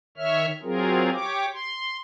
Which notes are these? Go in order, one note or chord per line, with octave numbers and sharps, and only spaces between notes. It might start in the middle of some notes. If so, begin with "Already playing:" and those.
D#3 C#5 E5 F6
F#3 C4 F4 G#4 A#4
G4 C#5 D6
C6